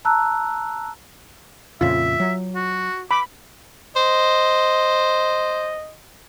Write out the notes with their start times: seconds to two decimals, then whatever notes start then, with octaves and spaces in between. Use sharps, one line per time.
0.05 A5 A#5 E6 F#6
1.81 F2 A#2 C#3 F4 E5
2.20 F#3
2.55 F#4
3.11 B5 D6
3.96 C5 D#5